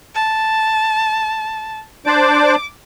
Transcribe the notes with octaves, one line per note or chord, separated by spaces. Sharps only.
A5
D4 C5 D5 D6